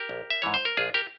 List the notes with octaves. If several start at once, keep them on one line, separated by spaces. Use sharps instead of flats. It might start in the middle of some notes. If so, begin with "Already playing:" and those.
Already playing: G4 A#4
A#1
E5
G#2 E3 C#5
C5
A#4
A#1 F4 G#4
G4 A#4